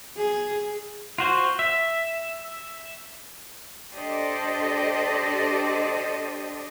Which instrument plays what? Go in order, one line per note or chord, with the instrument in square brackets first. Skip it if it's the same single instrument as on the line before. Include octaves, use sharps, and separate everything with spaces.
[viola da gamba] G#4
[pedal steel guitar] F4 F#4 C5
E5
[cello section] D4 G4 A4 C5 D5 D#5